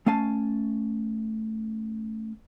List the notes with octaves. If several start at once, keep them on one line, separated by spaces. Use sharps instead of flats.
A3 C#4 F5 G#5 A5